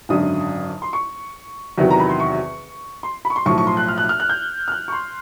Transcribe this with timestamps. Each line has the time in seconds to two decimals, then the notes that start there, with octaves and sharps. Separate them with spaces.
0.09 G#1 F#2 D3 D#6
0.82 C6
0.93 C#6
1.78 E2 C3 D#3 F#3
1.91 A#5
2.00 B5
2.09 C6
2.20 C#6
3.03 C6
3.25 B5
3.30 C#6
3.36 C6
3.45 B1 A2 F3 C#6
3.58 C#6
3.67 C6
3.77 F#6
3.88 F6
3.98 F#6
4.09 F6
4.20 F#6
4.29 G6
4.68 F6
4.72 F#6
4.88 C#6
4.92 C6